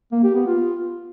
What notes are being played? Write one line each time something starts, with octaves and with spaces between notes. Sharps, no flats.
A#3
G4
B3
F4